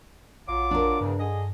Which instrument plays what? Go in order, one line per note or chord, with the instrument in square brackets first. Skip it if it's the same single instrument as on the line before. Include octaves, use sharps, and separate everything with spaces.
[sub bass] A#1 [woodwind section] F#3 F4 D6
[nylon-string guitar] D4 A#4
[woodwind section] E2 C#3 [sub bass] G2
[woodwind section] D3 G#4 D#5